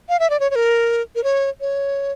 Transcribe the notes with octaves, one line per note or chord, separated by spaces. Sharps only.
F5
E5
D5
C#5
C#5
A#4
A#4
C#5
C#5